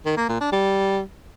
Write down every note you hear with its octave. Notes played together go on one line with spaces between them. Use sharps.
D#3
A#3
A#2
D4
G3